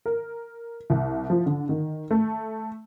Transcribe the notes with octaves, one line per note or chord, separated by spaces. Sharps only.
A#4
C2
F3
D3
D#3
A3